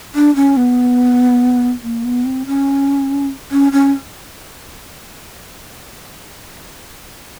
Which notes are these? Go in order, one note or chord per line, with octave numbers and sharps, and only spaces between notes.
D4
C#4
B3
A#3
B3
C4
C#4
C#4
C#4